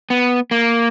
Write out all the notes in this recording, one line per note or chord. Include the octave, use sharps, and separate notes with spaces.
B3
A#3